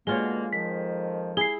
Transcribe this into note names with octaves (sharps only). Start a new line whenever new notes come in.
B2 D3 G#3 A#3 F4 C#5 G7
F2 D#3 F3 B6
E4 G#4 C7 G7